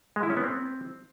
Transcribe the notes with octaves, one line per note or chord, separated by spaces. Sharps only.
G#3
E4
C#4
B3
C4